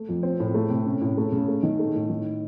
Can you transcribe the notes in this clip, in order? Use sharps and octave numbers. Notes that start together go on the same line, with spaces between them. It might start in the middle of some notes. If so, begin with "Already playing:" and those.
Already playing: A3
F2
C4
A2
A3
C3
C#4
A2
A3
C#3
A3
D#3
A3
A2
D#3